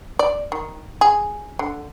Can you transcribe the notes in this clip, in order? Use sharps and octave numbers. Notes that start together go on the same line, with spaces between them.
D5
D#3
G#4
D3